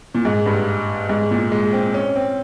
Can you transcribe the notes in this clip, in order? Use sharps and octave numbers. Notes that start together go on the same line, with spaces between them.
A#2
G#2
G2
G#2
A#2
G#3
C4
C#4
C4